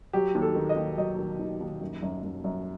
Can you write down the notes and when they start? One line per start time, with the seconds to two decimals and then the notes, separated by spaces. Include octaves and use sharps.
0.13 F#3 G4
0.35 D#2
0.42 A4
0.55 D#3
0.69 D#5
0.77 D#2
0.98 F#3 D#5
1.19 D#3
1.39 D#2
1.61 D#2
1.81 F#2
2.02 F#2
2.23 F#2
2.44 F#2